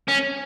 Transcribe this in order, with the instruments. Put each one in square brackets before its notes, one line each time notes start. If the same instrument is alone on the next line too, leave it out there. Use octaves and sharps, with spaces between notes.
[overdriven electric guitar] C#4